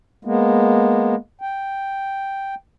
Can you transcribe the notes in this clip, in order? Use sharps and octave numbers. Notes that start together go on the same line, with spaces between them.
G#3 A#3 B3
G5